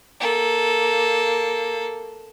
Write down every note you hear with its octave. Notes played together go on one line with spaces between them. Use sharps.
A#3 A4